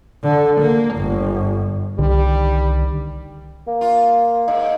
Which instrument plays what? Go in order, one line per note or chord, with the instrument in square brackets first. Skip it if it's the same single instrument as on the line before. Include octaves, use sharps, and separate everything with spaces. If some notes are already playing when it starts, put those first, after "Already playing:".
[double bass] D3
A#3
G1
[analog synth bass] C2 [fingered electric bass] D3 D#3 [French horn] G3
[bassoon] A#3
[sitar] F4
[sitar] G#2 [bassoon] D#4